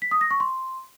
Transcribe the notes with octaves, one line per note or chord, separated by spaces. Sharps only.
B6
D#6
A#6
C#6
C6